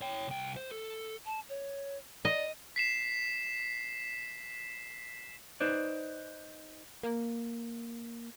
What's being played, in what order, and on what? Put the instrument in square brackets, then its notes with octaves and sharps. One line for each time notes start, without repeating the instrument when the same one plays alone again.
[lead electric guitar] C#5 G5
C2 G5
C5
A4
[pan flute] A5
C#5
[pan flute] D5 [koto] D#5
[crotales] B6 C7 E7
[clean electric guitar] D#4 B4 C5 D5
[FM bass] A#3